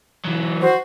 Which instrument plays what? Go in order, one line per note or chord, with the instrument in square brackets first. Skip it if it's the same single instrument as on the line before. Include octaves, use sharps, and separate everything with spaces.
[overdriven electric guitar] E3 F#3
[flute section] F#4 C5